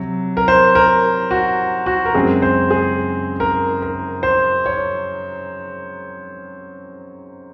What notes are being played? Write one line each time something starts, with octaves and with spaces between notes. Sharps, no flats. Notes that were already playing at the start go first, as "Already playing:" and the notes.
Already playing: C3 F#3
A#4
C5
A#4
F#4
F#4
A#4
F#2 C#3 G#3 C4 G#4
C5
G#4
A#4
A#4
C5
C#5